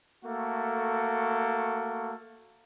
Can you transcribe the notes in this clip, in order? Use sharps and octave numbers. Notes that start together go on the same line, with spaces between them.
A3 A#3 F#4 A4